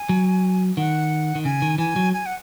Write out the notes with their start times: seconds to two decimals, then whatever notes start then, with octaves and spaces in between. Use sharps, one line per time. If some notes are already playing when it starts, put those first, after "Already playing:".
Already playing: G#5
0.09 F#3
0.77 D#3 F#5
1.35 D#3
1.45 C#3 G#5
1.62 D#3
1.78 E3 G#5
1.96 F#3
2.13 G#5
2.26 F#5